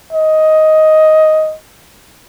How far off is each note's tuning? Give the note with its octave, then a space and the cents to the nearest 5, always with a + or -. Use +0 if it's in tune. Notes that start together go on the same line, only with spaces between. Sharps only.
D#5 +10